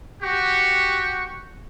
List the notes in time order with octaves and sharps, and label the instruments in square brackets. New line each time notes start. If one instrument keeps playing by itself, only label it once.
[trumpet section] F#4 G4 F#5 G5 C#6